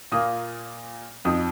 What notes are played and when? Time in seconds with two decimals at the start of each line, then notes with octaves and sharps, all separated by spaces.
0.12 A#2 A#3 F4 D#6
1.25 F2 F3 D#4 D#6